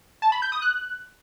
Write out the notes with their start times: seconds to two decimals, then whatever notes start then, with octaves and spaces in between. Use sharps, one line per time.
0.22 A5
0.32 B5
0.42 G6
0.52 D#6
0.62 F#6